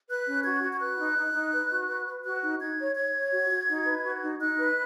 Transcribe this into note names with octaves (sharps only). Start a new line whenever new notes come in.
B4 F#6
C#4
F#4 G#6
F#4
G#6
B4 F#6
D#4
D#4
D#4
B4
F#4
B4
B4
F#4 F#6
D#4
D#4 G#6
C#5
C#5 G#6
C#5
F#4
F#4
D#4
B4
F#4
D#4
D#4 F#6
B4